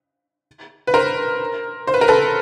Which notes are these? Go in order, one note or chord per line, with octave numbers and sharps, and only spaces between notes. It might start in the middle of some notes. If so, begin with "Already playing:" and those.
B4
A#4 C5
C5
B4
A#4
A4 B4